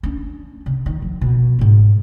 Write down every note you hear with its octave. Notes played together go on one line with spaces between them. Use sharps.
C#4 D4
C3
D#3
F3
B2
G#2 G#3